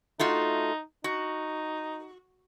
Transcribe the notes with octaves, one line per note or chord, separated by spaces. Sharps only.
A3 D#4 F4 F#4
D#4 F#4